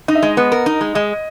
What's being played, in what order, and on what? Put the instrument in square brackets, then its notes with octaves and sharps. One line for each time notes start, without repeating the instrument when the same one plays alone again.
[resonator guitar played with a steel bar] D#4 [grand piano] D#5
[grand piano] E5
[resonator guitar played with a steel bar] G#3 [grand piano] D#5
[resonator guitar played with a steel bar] B3
A#4
D#4
G#3
[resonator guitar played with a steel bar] G#3 [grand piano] D#5